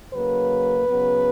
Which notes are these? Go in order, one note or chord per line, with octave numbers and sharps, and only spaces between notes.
C#3 F#3 A#3 B4
C#3 F#3 B3